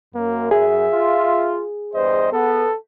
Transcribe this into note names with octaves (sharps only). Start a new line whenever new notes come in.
F#2 A#3
G#4 E5
F4
E2 G2 C5 D#5
B3 A4